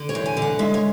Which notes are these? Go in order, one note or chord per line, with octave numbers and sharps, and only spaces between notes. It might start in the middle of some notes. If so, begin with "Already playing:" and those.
Already playing: D3
C#5
E2
G#5
D3
F#5
G#3 E5
C#5